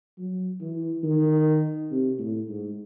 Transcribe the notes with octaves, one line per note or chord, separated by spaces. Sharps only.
F#3
E3
D#3
C3
A2
G#2